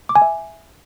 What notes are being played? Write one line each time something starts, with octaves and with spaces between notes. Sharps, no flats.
D6
G#5
E5